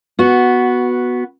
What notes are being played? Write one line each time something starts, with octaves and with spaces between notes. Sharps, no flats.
B3 F#4